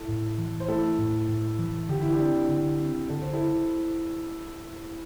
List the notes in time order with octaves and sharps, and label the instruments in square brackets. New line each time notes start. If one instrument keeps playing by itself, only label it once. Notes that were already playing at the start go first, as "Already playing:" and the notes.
Already playing: [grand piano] E4 A4
[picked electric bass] A2
E3
[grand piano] C5
[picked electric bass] A3 [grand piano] E4 A4
[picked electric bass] A2
A2
E3
[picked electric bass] D3 [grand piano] G4
[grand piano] E4
D4 G4
[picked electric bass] C4
D3
C4
[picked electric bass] D3 [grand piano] A4
[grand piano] C5
E4 A4